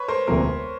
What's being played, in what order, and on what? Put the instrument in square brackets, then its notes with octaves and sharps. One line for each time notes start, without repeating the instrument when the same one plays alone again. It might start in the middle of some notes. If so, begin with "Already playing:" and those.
Already playing: [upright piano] B4 C#5
A#4 C5
[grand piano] E1 D2 C3 F3 A#3 [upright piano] A#4